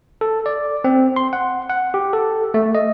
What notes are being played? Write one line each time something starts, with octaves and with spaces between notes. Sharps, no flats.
A4
D5
C4
C6
F#5
F#5
G4
A4
A3
D#5